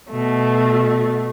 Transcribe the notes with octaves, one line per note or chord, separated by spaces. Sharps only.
B2 A3